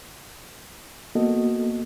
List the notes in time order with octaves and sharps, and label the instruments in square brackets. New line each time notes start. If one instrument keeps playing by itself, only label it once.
[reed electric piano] A#3 B3 F#4 A4 D#5